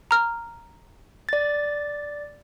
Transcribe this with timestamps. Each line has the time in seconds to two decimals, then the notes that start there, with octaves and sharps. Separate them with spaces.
0.11 A#5 F6
1.29 D5 A6